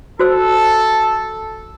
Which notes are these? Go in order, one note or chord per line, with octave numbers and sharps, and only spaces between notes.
F#4 A4 C5 E6